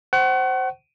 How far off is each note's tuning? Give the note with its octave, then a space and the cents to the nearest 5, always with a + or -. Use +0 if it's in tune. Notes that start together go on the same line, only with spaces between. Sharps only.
C5 +0 F#5 +35 C#6 -20